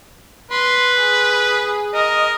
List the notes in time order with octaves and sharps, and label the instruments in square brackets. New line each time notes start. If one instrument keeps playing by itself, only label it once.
[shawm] B4 [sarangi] C6
[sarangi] G#4
[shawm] A#4 [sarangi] D#5